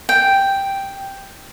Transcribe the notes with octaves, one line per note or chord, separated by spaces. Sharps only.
G5